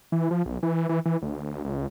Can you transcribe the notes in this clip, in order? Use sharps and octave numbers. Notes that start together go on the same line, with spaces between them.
E3
F3
B1
E3
E3
E3
D2
C#2